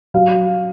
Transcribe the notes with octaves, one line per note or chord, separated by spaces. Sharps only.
F#3 F5